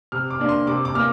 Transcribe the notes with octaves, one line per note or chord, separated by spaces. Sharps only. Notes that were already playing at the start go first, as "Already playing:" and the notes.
C3 F6
D6
A#3 D4
C6
C3 D6
D6
A#3 F6